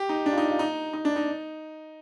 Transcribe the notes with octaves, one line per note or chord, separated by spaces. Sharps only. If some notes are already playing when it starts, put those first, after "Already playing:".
Already playing: G4
D#4
D4
F4
D#4
F4
D#4
D#4
D4
D#4